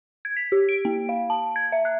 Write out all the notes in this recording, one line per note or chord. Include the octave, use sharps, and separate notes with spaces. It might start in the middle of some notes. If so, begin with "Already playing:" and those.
G#6
B6
G4
D7
A#3
F5
A5
G#6
E5
F#6